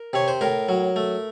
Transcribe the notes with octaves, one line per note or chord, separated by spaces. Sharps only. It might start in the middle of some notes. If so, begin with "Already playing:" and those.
Already playing: A#4
C3 C#5
C5
A2 A#4
F#3
A3